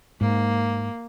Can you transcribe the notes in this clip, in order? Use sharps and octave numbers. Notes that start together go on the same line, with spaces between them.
G#2 A#3